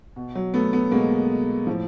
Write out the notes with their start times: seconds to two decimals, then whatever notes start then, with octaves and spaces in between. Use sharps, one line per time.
0.16 B2
0.35 F#3
0.54 A3 B3
0.73 A3 B3
0.91 B2 G#3 A#3
1.67 A2 F3